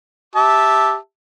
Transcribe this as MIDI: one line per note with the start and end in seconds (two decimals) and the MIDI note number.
0.36 0.95 67
0.36 0.95 76
0.36 0.95 81